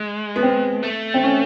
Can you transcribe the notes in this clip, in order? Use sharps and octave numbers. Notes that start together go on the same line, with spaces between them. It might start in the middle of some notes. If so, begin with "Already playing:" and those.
Already playing: G#3
B3
C4
A3
C4
C#4